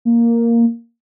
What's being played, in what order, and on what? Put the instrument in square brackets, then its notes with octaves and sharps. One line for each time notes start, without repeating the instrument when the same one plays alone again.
[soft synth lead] A#3